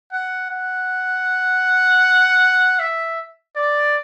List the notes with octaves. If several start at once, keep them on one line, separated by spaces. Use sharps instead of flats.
F#5
F#5
E5
D5